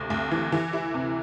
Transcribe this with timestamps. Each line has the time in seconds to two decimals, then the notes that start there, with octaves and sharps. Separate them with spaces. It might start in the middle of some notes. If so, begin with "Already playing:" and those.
Already playing: D2 C3
0.10 D2
0.31 E3
0.52 E3
0.73 E4
0.94 C3